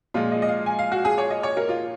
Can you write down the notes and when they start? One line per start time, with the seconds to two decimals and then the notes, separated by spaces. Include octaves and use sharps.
0.14 A#2 F3 G#3 F4
0.32 D#5
0.42 D#5
0.48 F5
0.66 G#5
0.79 F5
0.92 F#4
1.05 G#4
1.18 C#5
1.31 D#5
1.43 C#5
1.57 A#4
1.69 F4